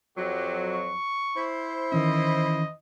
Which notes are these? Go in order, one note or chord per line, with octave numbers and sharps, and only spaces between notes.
F2 F#3 G4
C#6
E4 C5
D#3 E3 C#4 D#5